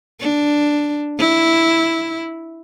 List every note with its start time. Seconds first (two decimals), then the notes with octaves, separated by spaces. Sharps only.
0.20 D4
1.19 E4